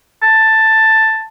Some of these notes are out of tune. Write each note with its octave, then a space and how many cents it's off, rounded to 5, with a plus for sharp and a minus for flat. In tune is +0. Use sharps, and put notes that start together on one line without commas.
A5 +5